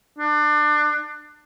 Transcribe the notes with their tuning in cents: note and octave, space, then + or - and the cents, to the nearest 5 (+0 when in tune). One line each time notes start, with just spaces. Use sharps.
D4 +25